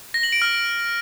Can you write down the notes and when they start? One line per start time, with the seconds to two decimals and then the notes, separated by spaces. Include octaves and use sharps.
0.14 A#6
0.23 F#7
0.32 D7
0.42 F6